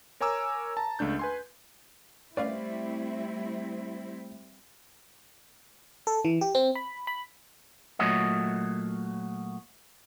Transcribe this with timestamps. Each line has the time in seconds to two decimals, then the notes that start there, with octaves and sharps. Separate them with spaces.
0.21 A#4 C#5 G#5 A#5 D6 E6
0.77 A5 A#5
0.99 C#2 A3 D4 G6
1.19 B4 G#5 C6
2.37 G3 A3 C4 E4 D5 F5
6.07 A4
6.25 E3
6.41 G4
6.55 C4
6.75 B5
7.07 B5
7.99 A#2 F#3 A3 F#4 C#5 D#5